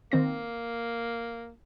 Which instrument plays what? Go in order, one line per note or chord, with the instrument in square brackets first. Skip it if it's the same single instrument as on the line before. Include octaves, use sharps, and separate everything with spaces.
[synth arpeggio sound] D#3 C4 A#6 [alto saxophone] A#3